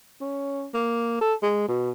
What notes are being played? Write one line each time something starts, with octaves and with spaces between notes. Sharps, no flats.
C#4
A#3
A4
G#3
B2